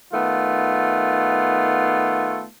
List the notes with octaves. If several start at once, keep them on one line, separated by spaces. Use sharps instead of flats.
D#3 A3 B3 F4